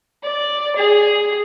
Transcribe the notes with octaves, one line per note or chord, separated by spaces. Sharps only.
D5
G#4